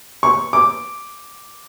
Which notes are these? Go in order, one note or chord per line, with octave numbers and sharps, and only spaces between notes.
C#6
D6